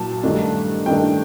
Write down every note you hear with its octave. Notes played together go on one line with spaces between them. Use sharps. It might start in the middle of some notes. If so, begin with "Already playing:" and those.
Already playing: A#2 F#3 A5
G2 D#3 A3 D4
G2 D#3 A3 D4 G5